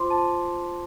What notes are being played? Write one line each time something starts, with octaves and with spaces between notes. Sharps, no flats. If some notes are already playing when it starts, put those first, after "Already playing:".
Already playing: F4 C5 C6 D6
A5